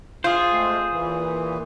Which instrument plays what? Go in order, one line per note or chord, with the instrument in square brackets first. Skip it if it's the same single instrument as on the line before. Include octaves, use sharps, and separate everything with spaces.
[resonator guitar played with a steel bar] F4 [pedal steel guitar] G#4 C5
[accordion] G#3 A3 C4
A#2 E3